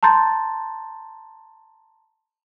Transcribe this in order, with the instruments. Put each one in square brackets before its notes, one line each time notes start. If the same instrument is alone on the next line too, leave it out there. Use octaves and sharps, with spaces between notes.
[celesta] A5 A#5 C6 G6 A6